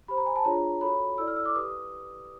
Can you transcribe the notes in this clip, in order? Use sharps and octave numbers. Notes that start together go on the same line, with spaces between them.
G4 C5 B5
A#5
G#5
A5
D4 F4 G#4 C#5 A#5
F#4 A4 C#5 B5
E4 A4 D5 E6
F6
E6
D6
G4 B4 D#6